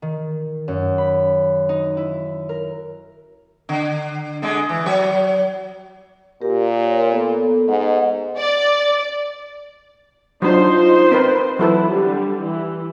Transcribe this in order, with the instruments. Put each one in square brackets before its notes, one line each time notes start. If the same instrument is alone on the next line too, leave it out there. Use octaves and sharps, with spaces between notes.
[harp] D#3
F#2
B5
D#4
E4
A#4
[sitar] D3
D3 G#3
E3
F#3 C#5
[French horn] A#2 [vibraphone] G4 A#4
[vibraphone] A#4 C#5
B3 A4
[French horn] G#2 [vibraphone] D#5 F#5
[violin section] D5
[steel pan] F#3 D4 [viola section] D#4 F4 C5
[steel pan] C4 A#4 B4
[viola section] E3 E4 [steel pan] F#3 A4 B4
[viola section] D3 G3
E3